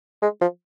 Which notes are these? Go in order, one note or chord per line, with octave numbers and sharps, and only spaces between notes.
G#3
F3